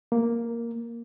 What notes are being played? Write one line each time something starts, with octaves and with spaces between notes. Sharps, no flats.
A#3